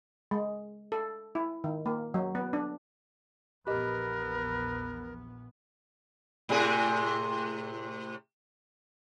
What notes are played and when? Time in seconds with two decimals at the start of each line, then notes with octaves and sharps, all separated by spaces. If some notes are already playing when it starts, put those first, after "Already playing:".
0.31 G#3
0.92 A4
1.35 E4
1.64 D#3
1.86 A#3
2.14 F#3
2.35 B3
2.53 D4
3.67 A#1 E2 B3 G4 A#4 B4 D#5
6.49 A2 C3 G#4